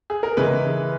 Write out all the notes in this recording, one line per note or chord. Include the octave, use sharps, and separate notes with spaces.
G#4
A#4
C#3 E3 G#3 B3 B4